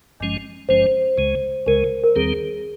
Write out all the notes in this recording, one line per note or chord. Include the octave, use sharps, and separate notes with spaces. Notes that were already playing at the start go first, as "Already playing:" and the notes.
G#1 G2 F3 G#3 C#4
G#1 G2 F3 G#3 C#4 C5
C#2 C#3 G#3
C#2 C#3 G#3 A#4
A#4
D#2 D#3 G3 C4 G#4